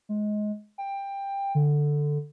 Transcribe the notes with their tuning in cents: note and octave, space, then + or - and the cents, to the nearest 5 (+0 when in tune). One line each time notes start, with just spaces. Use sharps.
G#3 +20
G5 +15
D3 +5